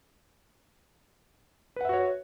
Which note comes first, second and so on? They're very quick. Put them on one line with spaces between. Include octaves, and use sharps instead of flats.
B4 F#5 E5 F#4 C#5